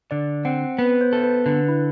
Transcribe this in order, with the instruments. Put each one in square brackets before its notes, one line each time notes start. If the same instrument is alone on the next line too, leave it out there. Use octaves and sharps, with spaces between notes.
[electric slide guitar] D3 [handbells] D5
[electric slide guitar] C4 [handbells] F#5
[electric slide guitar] B3 [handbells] B4
[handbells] C5
[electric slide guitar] A4
[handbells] B4
[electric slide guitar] D3 [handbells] B4
[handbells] E4